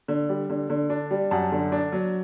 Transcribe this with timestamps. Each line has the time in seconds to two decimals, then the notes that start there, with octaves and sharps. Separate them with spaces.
0.08 D3
0.29 G3
0.50 D3
0.70 D3
0.90 D4
1.11 G3
1.31 F#2 F#5 A5
1.52 D3
1.72 D4
1.92 F#3